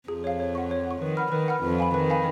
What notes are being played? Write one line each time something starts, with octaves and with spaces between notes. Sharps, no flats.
F2 F3 G#4
C#5 F5
C#5
F#5 C#6
C#5
F#5 C#6
D#3 B4
F#5 B5 F6
D#3 B4
F#5 B5 F6
F2 F3 B4
F5 G#5 B5
D#3 B4
F5 G#5 B5